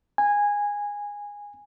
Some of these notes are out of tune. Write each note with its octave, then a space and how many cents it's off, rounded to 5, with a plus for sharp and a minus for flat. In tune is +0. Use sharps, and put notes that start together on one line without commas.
G#5 -15